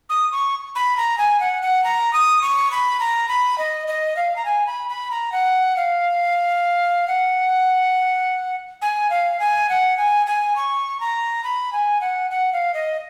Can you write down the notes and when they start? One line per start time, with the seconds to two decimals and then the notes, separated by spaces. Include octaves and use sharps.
0.10 D#6
0.32 C#6
0.75 B5
0.97 A#5
1.18 G#5
1.40 F#5
1.62 F#5
1.84 A#5
2.13 D#6
2.42 C#6
2.71 B5
3.00 A#5
3.29 B5
3.58 D#5
3.87 D#5
4.17 F5
4.36 A#5
4.45 G#5
4.67 B5
4.89 B5
5.11 A#5
5.32 F#5
5.77 F5
7.08 F#5
8.82 G#5
9.10 F5
9.40 G#5
9.69 F#5
9.97 G#5
10.27 G#5
10.56 C#6
11.00 A#5
11.44 B5
11.73 G#5
12.01 F#5
12.31 F#5
12.53 F5
12.74 D#5